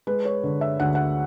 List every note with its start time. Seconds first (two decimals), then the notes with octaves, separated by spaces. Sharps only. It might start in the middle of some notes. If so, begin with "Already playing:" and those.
0.07 G#3 B4
0.25 C#5
0.44 D3
0.61 E5
0.80 D2 F#5
0.95 F#5